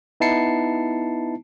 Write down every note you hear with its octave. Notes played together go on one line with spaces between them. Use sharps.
B3 D#4 E4 A5 C7 C#7